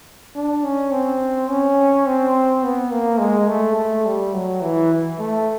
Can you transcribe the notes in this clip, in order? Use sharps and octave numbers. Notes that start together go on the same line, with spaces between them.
D4
C#4
C4
C#4
C4
B3
A#3
G#3
A3
A3
G3
F#3
E3
A3